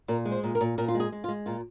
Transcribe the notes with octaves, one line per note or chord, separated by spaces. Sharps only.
A#2 A#4
G#3
C5
A#2
A#4
A#2
A#2 A#4
F4
G#3
G#4
G#3
F4
G#3
A#2 F4